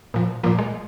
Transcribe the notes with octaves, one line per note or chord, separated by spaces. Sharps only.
A#2 F3
A#2 F3 A#3
G#3